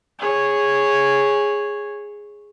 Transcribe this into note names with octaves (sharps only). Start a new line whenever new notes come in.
G#4 C#5